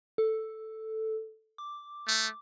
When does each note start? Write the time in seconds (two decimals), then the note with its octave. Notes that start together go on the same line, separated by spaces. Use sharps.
0.18 A4
1.58 D6
2.08 A3